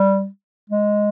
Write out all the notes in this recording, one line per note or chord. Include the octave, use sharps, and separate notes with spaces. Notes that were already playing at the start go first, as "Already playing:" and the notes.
Already playing: G3
G#3